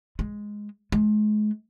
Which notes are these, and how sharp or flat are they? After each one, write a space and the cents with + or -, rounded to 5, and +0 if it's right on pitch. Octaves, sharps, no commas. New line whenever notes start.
G#3 +0
G#3 +35